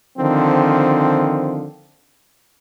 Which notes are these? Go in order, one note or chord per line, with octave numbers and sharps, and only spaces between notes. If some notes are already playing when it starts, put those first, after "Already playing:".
D3 D#3 F3 C4